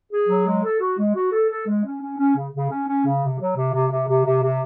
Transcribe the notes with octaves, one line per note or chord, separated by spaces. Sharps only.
G#4
F#3
G#3
A4
F#4
G#3
F#4
A4
A4
G#3
C#4
C#4
C#4
C#3
C#3
C#4
C#4
C#3
C3
F#3
C3
C3
C3
C3
C3
C3